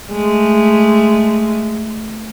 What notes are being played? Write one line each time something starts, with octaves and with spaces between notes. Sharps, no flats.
G#3 A3